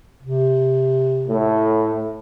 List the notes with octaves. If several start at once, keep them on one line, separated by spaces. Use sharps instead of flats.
C3
A2